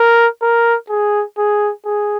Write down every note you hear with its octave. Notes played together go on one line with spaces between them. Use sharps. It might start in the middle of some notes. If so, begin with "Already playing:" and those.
Already playing: A#4
A#4
G#4
G#4
G#4